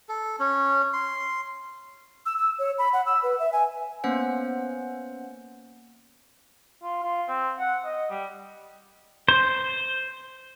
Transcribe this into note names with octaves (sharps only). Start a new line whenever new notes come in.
A4
C#4
C6
E6
E6
C#5
B5
F#5
E6
B4
E5
G#5
A#3 B3 C#4 C5 F#5
F4
F4
C4
F#5
D#5
G3
C5